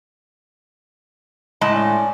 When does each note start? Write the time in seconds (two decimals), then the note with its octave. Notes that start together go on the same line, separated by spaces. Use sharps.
1.61 A2 G#3 A5
1.73 C#4 D4